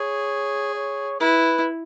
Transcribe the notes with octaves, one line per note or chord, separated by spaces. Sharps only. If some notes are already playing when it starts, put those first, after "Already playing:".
Already playing: G#4 C#5
C#5
E4 B4